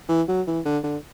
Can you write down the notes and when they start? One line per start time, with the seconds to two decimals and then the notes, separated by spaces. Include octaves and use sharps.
0.09 E3
0.28 F#3
0.47 E3
0.65 D3
0.83 D3